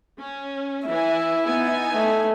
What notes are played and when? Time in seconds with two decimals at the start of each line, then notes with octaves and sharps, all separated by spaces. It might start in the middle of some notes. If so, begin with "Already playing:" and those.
0.18 C#4
0.87 E3 E4 G#5
1.46 B3 D#4 G#5
1.95 A3